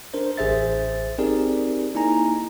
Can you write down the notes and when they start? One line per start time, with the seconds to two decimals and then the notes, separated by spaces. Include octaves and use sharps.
0.14 D4 A#4 C5
0.37 A1 G#4 C5 E5 A6
1.18 C4 D#4 G4 G#4 A#4 D5
1.95 A#3 D#4 E4 G#5 A#5